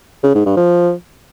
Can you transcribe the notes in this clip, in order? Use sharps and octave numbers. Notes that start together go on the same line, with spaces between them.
C#3
G#2
G2
F3